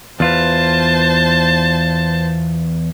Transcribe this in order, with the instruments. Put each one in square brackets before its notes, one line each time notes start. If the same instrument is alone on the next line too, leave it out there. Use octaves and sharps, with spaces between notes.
[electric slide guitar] E2 F4 B4 [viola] C5 A5